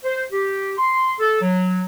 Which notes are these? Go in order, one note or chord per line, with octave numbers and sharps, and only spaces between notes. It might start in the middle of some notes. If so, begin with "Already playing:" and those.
C5
G4
C6
A4
F#3